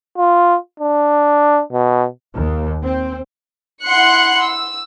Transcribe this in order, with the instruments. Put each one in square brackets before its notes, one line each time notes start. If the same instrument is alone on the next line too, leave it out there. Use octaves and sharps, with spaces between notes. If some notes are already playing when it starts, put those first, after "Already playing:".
[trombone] F4
D4
B2
[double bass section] D#2
C4
[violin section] E4 F#5 C6 F#6 C#7
E6